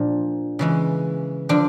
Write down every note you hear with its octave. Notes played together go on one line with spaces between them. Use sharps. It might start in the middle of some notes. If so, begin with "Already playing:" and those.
Already playing: A#2 F3 A#3 D4
C#3 E3 G#3
D3 F3 D4